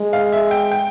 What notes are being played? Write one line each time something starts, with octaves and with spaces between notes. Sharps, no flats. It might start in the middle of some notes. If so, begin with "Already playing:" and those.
Already playing: G#3
F5
E5
G5
G5